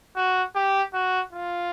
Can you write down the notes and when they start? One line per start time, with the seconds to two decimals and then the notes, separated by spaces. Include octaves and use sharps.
0.16 F#4
0.55 G4
0.93 F#4
1.33 F4